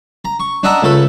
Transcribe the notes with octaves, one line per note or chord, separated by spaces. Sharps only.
A#5
C#6
D4 D#5 E5 F#5 A#5
C#2 A3 A4 B5